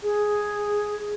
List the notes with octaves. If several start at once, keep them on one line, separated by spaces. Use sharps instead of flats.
G#4